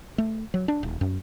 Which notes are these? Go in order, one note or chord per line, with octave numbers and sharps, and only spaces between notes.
A3
F#3
D4
D#1
F#2